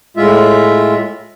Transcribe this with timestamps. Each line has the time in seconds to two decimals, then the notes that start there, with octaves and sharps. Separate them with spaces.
0.17 A2 G#3 F4 E5